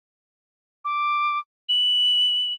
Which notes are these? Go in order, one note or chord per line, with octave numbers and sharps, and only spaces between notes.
D6
F#7